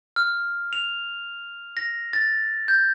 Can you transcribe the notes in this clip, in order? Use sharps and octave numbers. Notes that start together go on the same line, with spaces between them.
F6
F7
A#6
A6
G6